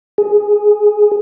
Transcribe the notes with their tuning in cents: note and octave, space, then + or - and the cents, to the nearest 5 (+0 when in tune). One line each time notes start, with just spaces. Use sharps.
G#4 +0